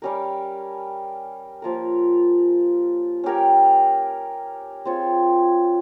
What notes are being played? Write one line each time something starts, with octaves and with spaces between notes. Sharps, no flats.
G3 C#4 G4 A#4
F3 A#3 F4 A#4
C#4 G4 A#4 C#5
C4 F4 G#4 C#5